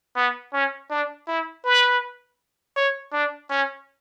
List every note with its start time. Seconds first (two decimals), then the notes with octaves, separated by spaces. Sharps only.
0.17 B3
0.53 C#4
0.91 D4
1.28 E4
1.65 B4
2.76 C#5
3.13 D4
3.51 C#4